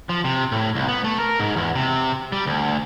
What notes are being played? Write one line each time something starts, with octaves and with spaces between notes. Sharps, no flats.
F3
C3
A2
C2
B3
A3
A#4
G#2
E2
C3
G3
D2